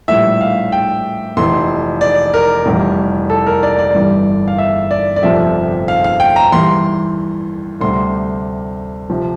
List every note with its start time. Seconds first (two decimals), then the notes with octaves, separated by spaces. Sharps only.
0.08 A#1 A2 G3 E5
0.41 F5
0.72 G5
1.37 F1 F2 E3 C6
2.01 D5
2.34 A#4
2.66 F1 E2 E3 G3
3.30 A4
3.46 A#4
3.63 D5
3.79 D5
3.94 G1 G2 E3 G3
4.48 F5
4.58 E5
4.91 D5
5.16 D5
5.23 G1 F2 C3 F3 E5
5.88 F5
6.04 F5
6.20 G5
6.36 A#5
6.52 E2 E3 G3 C6
7.81 D2 C3 G3 C6
9.10 C3 F3